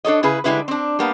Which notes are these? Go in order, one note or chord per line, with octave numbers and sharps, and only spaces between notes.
D4 A4 C#5 D#5
C#3 E4 G#4 B4
D3 G3 G#3 E4 F4 B4
C4 D4
G3 A#3 B3